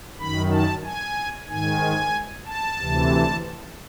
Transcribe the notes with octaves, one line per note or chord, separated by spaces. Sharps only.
F#2 D#3 B5
A5
G#5
G#2 D#3 G#5
A5
D2 C3 E3